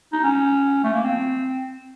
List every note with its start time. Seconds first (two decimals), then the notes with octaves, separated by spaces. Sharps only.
0.12 D#4
0.23 C#4
0.84 A3
0.94 A#3
1.04 C4